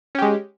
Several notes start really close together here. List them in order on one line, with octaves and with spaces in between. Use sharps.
C#4 G4 G#3